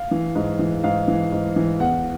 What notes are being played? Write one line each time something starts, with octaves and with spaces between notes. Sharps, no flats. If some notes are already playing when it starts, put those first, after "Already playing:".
Already playing: F5
E3
G#2
E3
G#2 F5
E3
G#2
E3
E2 F#5